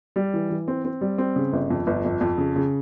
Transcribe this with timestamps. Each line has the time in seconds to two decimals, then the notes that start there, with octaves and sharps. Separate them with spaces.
0.16 G3
0.34 E3
0.50 E3
0.68 C4
0.85 C4
1.01 G3
1.18 C4
1.36 C#3
1.53 G1
1.71 F2
1.87 G1
2.05 F2
2.21 F2
2.38 C#3
2.56 C#3